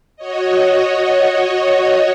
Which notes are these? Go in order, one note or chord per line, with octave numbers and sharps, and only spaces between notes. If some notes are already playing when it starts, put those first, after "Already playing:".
F#4 C#5 D#5